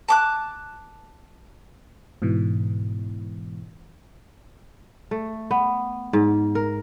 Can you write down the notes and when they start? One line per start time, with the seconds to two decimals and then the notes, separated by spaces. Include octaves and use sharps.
0.09 A5 D6 F#6
2.22 G#2 B2 E3
5.11 A3
5.51 B3
6.13 G#2
6.55 A#4